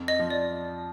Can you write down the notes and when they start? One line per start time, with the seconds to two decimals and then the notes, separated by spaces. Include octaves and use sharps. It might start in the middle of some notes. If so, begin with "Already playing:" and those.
Already playing: F2
0.08 D#5
0.19 F3
0.30 D5